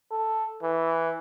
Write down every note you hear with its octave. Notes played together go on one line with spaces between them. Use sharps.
A4
E3